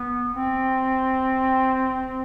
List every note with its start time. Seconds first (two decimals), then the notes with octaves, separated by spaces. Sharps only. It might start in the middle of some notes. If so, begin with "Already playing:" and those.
Already playing: B3
0.34 C4